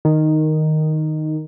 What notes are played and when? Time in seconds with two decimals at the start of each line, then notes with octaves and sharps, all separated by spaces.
0.05 D#3